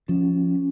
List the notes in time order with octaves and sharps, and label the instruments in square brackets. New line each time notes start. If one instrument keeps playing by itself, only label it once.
[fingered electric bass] F3 [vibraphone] C#4